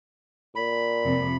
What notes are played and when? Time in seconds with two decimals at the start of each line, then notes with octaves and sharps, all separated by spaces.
0.56 A#2 B5
1.04 F2 C3